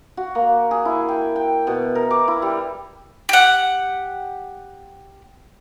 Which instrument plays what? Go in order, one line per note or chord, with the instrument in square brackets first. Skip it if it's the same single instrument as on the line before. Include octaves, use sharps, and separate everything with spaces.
[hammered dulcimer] F#4
A#3
G#4
E4
G5
G5
B2
A#4
D6
E4
G3
[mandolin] G4 F#5